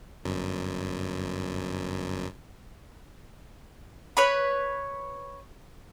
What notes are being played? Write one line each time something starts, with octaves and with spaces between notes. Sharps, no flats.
G1 F#2
B4 C#5 B5